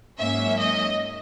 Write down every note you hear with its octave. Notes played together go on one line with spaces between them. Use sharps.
G#2 F#3 A#3 C#4 E5
D#5